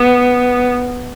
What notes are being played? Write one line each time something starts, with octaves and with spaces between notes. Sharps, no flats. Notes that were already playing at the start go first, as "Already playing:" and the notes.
Already playing: B3